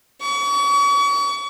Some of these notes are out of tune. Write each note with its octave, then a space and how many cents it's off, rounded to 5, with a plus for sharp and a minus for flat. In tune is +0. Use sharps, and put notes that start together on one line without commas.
C#6 +40